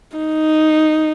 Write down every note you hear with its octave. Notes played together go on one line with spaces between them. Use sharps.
D#4